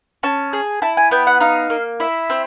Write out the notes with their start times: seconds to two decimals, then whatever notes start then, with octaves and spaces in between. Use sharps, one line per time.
0.23 C#4 A5
0.53 G#4
0.82 E4 A5
0.97 G#5
1.11 B3 G5
1.27 F#5
1.40 D#4 F5
1.70 A#3
2.00 E4 E5
2.30 C4